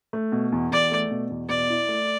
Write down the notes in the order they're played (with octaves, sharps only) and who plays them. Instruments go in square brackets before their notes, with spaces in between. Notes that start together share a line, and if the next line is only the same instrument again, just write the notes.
[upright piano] A3
B2
E2
[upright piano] E2 [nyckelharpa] D5
[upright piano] A3
B2
E2
[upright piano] B2 [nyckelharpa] D5
[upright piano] E4
A3